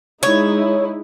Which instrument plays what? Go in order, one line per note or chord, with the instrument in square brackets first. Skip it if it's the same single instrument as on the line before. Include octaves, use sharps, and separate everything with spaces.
[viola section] G#3 D#4 E4 [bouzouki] C#5